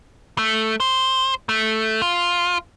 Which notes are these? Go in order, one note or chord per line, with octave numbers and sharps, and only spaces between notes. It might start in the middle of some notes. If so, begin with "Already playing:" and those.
A3
C5
A3
F4